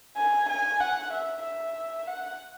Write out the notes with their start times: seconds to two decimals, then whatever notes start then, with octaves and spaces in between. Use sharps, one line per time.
0.17 G#5
0.49 G#5
0.80 F#5
1.13 E5
1.44 E5
2.07 F#5